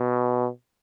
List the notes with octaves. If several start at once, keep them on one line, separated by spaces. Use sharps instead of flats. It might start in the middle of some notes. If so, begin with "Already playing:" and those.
Already playing: B2